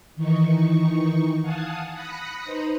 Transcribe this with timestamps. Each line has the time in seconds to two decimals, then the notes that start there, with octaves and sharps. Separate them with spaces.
0.15 D#3 E3 D#4 C#6
1.41 F5 F#5 G#5 A5 D#6
1.93 B5 D#6 F#6 A#6 C#7
2.45 D#4 B4 C5 A#5